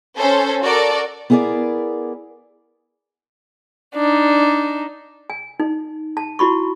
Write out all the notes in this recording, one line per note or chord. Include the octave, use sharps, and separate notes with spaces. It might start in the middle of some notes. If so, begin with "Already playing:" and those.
C#4 A4 C5
F#4 A4 A#4 D5
B3 E4 G#4 A#4 D5
D4 D#4
G#5
D#4
A5
E4 F#4 B5 C#6